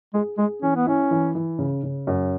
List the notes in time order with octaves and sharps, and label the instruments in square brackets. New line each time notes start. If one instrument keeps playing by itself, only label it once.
[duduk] G#3 [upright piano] G#4
[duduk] G#3 [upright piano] G#4
[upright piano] E3 [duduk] C#4
[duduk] B3
[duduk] C#4 [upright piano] E4
[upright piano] E3
E3
C#3
C#3
F#2